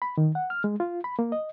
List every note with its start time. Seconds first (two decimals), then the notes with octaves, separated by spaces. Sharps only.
0.02 B5
0.17 D#3
0.35 F#5
0.50 F6
0.64 G#3
0.80 F4
1.04 B5
1.19 A#3
1.32 D#5